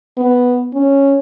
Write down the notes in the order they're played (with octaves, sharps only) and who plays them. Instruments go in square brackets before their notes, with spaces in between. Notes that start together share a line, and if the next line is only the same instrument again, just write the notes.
[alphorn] B3
C#4